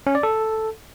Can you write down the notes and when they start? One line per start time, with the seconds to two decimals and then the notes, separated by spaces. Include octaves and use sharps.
0.07 C#4
0.15 D5
0.23 A4